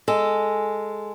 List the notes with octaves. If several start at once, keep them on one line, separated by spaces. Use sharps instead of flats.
G#3 A4